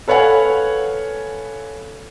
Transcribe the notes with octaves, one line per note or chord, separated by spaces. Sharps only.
A4 B4 C#5 F5 F#5 G#5